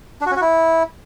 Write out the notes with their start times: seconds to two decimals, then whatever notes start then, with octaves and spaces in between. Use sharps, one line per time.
0.21 D4
0.26 F#4
0.31 C#4
0.36 F#4
0.41 E4